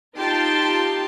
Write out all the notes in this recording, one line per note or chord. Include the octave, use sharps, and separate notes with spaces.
D#4 F4 G4 G5 A5 C6